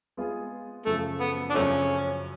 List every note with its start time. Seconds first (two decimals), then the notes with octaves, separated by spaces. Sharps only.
0.17 G#3 B3 F4 G#4
0.86 F#2 C#3 F3 A3
1.20 B3
1.50 D4
1.55 F#2 C#3 F3 A3 C#4